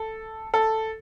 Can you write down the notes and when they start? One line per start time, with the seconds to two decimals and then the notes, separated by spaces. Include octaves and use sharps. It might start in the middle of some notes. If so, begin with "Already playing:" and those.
Already playing: A4
0.54 A4